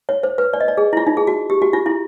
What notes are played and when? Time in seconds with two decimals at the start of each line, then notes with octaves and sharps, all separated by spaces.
0.09 C#5
0.23 C5
0.38 B4
0.53 D5
0.60 D#5
0.68 D5
0.77 G#4
0.93 E4
0.97 F4
1.07 D#4
1.17 G#4
1.27 F#4
1.50 G4
1.62 F#4
1.73 F4
1.86 E4